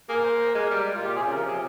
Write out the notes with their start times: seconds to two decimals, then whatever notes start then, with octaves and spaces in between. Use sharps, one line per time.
0.09 A#3 G#4
0.24 C5
0.55 G#3 A#4
0.70 G3
0.95 F4
1.00 A#2 G4
1.16 C3 G#4
1.26 C#3
1.32 A#4
1.36 F3
1.47 C3 G#4